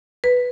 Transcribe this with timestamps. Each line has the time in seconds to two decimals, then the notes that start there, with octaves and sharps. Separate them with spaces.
0.24 B4